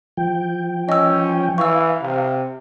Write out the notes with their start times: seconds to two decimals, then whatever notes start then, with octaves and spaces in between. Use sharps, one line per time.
0.17 F3 G5
0.89 C#4 D#5 E6
1.58 E3 F5 C#6 E6
2.02 C3